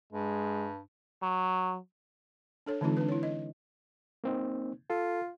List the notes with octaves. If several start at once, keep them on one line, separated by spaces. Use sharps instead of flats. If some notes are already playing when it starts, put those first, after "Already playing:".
G2 G#3
F#3
D4 A4 C#5
D3 E3 G#3 C4 D#4 F4
D4 B4
E4 C#5
D#5
A#3 C4 D#4
F4 A4